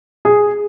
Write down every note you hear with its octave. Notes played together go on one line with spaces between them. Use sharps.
G#4